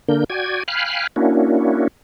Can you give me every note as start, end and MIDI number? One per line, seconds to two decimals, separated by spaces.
0.09 0.24 50
0.09 0.24 58
0.09 0.24 62
0.09 0.24 70
0.09 0.24 91
0.30 0.63 66
0.30 0.63 74
0.30 0.63 79
0.30 0.63 80
0.30 0.63 92
0.68 1.07 77
0.68 1.07 79
0.68 1.07 80
0.68 1.07 83
0.68 1.07 89
0.68 1.07 90
1.16 1.88 58
1.16 1.88 61
1.16 1.88 62
1.16 1.88 64
1.16 1.88 66